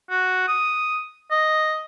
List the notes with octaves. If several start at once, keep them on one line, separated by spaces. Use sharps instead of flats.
F#4
D#6
D#5